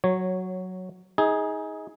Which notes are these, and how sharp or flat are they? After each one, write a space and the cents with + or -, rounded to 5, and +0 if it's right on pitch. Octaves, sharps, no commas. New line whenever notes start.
F#3 +0 C#5 -10
D#4 +30 G#4 +0